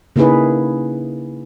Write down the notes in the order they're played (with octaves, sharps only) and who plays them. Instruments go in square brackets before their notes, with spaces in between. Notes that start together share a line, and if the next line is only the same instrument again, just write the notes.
[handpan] C#3 A#3 D#4 E4 G#4 B4